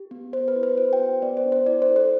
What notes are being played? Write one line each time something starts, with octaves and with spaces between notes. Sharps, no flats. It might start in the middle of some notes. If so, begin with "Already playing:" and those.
Already playing: G4
B3
B3 C5
B4
E4
B4
F#4 C5
G5
B3
B3 D5
C5
D4
C5
E4 D5
C5
A4
C5